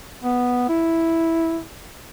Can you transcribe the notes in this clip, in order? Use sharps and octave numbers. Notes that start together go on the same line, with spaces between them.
B3
E4